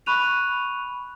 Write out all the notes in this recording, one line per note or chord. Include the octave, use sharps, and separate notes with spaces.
B5 C#6 F#6 D#7 F7